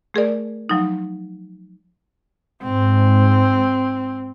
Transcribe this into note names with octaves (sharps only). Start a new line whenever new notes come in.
A3 G#4 A#4 D5
F3 F#3 D#4
G#2 C4